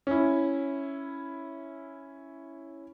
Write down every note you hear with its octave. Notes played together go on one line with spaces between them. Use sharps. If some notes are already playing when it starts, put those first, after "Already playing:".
C#4 E4